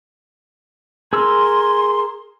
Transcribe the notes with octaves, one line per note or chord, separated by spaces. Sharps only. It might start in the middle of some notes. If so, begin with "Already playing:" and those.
G#4 A#4 C6 E6